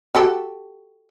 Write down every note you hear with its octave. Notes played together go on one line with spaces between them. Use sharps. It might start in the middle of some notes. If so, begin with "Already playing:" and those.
F#4 G4 A4